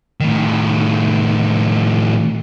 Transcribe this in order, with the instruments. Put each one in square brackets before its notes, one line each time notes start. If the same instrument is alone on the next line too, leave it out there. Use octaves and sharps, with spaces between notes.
[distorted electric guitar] A2 D#3